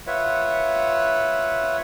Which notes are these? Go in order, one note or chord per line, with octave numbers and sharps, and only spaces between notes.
F4 B4 C#5 E5 F#5